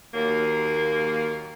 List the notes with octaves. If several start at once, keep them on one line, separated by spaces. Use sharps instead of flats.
D#2 F#3 A#3